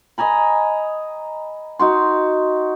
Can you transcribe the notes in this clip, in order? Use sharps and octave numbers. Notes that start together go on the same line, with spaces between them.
D#5 G#5 A#5 B5
D#4 F#4 C6